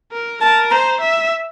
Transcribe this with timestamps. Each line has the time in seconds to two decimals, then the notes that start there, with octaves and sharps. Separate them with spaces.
0.12 A#4
0.41 A#4 A5
0.71 C5 A#5
1.01 E5